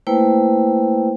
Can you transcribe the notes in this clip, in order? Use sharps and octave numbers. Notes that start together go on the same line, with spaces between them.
A3 A#3 E4 B4 C5 G5